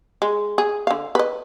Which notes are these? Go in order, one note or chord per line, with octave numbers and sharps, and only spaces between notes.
G#3
G#4
D3 F5
B4 D#5